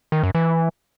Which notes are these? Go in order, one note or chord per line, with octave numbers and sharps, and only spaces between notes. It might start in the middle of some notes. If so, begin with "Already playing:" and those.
D#3
F#2
E3